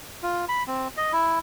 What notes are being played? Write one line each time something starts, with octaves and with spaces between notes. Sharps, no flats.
F4
B5
C4
D#5
E4